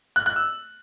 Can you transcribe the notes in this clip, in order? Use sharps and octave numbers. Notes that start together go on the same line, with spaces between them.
F#6
F#6
E6